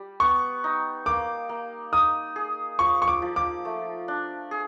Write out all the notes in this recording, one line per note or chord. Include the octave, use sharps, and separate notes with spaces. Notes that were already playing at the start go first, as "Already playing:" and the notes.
Already playing: G3 G4
B3 C#6
D#4
A#3 D6
A#3
D#4 D#6
G#4
F3 C#6
C#6
D6
F3
D6
A3
D4
G#4